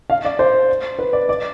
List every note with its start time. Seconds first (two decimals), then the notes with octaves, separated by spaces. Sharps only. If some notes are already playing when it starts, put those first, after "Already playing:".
0.10 F5
0.25 D5
0.39 C5
0.99 B4
1.13 D5
1.29 D5